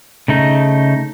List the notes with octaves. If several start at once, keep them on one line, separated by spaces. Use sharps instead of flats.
C#3 A3 D#4